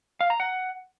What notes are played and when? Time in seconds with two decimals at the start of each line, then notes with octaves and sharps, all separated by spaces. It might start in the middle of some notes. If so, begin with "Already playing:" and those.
0.21 F5
0.30 A#5
0.40 F#5